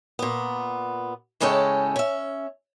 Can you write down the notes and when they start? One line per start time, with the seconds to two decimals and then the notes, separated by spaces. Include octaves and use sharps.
0.19 A#2 B3
1.40 A2 C#3 G#3 C#4 A4 G5
1.96 C#4 E5